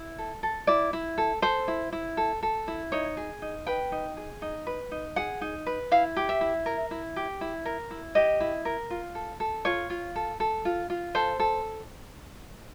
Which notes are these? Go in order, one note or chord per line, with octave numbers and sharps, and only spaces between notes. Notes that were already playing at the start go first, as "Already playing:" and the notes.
Already playing: E4
A4
A4
E4 D5
E4
A4
A4 C5
E4
E4
A4
A4
E4
D#4 C#5
G#4
D#4
B4 G5
D#4
G#4
D#4
B4
D#4
G#4 F#5
D#4
B4
E4 F5
G4
E5
E4
A#4
E4
G4
E4
A#4
E4
G4 D#5
E4
A#4
F4
A4
A4
F4 C#5
F4
A4
A4
F4
F4
A4 C5
A4